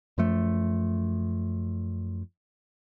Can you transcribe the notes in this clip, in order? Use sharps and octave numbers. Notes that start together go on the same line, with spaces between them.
F#2 F3 A3